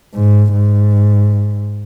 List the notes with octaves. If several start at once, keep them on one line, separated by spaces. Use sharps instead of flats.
G#2
G#2